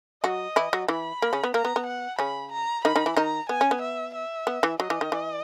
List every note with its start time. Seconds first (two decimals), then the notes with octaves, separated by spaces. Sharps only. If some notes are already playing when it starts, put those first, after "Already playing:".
0.24 F#3 F#4 D#5
0.56 E3 E4
0.73 F#3 F#4
0.88 E3 E4 B5
1.22 A#3
1.33 C#3 C#4
1.44 B3
1.54 A#3 A#5
1.65 B3
1.76 B3
1.86 F#5
2.19 C#3 C#4 B5
2.52 A#5
2.85 D#3 D#4 B5
2.96 D#3 D#4
3.06 E3 E4
3.17 D#3 D#4 A#5
3.49 B3 G#5
3.61 C#4
3.71 B3
3.82 E5
4.15 E5
4.47 B3
4.63 E3
4.79 F#3 D#5
4.90 E3
5.01 D#3
5.12 E3